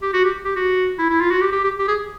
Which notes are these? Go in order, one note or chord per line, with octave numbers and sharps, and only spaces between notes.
G4
F#4
G4
G4
F#4
E4
E4
F4
F#4
G4
G4
G4
G4
G#4